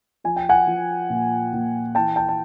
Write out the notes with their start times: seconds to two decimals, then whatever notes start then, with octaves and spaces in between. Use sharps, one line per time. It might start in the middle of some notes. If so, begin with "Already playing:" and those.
0.24 F3 G#5
0.37 G5
0.49 F#5 G#5
0.67 F3
1.10 A#2
1.53 A#2
1.95 E3 G5 A5
2.16 G5 A5
2.29 A5